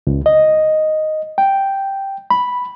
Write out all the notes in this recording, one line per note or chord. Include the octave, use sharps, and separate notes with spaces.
C#2
D#5
G5
B5